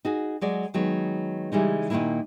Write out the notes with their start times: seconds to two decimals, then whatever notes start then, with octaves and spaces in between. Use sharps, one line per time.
0.05 D#4 F#4 G#4
0.41 F#3 G#3 D5
0.74 D#3 F#3 G#3 B3
1.52 C#3 E3 G3 G#3 D#4
1.90 A#2 D#3 F3 G#3 A#3 E4